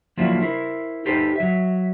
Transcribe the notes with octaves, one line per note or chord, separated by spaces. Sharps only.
F3 F#3 A#3 D4 E4 F4
E4 A#4 C5
D#4 G4 A4 B4 C5
F#3 E5